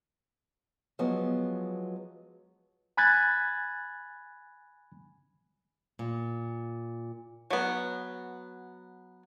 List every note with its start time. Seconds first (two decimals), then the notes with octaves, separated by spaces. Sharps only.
0.99 F3 F#3 G#3 B3
2.97 G#5 B5 F#6 G#6 A6
5.99 A#2
7.51 F#3 B3